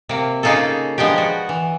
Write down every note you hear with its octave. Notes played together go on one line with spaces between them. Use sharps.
C3 A#3
C#3 A#3 D#4 F4 G#4 A4
F3 G#3 B3 D4 G4
F#4
E3